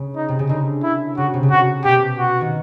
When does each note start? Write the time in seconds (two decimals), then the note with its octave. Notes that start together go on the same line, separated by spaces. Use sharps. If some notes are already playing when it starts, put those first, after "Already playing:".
Already playing: C#3
0.16 D#4
0.28 C3
0.39 C#3
0.49 D3 D#4
0.83 E4
1.17 C#3 F#4
1.34 C3
1.43 C#3
1.50 C3 F#4
1.84 B2 G4
2.19 F#4
2.41 D#3